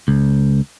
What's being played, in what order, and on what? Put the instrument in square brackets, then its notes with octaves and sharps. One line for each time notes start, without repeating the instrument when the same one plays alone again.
[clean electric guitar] C#2